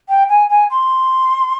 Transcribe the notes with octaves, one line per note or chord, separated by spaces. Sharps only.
G5
G#5
G#5
C6